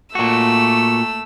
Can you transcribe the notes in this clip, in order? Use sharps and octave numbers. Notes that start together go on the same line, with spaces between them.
A#2 A3 F#4 E6